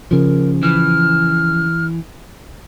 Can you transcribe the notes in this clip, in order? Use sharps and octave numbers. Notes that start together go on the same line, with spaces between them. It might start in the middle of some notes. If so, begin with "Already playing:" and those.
C#3 F3 A#4
E3 F6